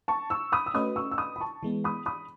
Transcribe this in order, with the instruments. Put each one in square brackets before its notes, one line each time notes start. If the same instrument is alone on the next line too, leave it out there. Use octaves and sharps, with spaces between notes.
[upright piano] A5 C#6
C#6 E6
B5 D#6
E6
[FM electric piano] A3 C#4 F#4 B4 D#5 [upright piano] B5 D#6
[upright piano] C#6 E6
E6
B5 D#6
B5
A5 C#6
[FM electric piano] E3 G#3 B3
[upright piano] B5 D#6
B5 D#6